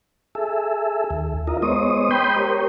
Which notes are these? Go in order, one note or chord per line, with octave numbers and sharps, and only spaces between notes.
G#4 A4 E5
D#2
E4 F4 A#4 D#5
G#3 B3 C5 C#5 D#5 D#6
G5 B5 C6 D#6 G6
G4 A#4 C5 C#5